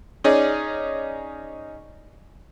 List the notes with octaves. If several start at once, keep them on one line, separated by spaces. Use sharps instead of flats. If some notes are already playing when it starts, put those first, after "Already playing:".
C#4 D#4 G#4 D5